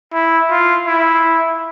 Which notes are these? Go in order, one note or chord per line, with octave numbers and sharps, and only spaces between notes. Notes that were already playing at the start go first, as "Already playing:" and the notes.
E4
F4
E4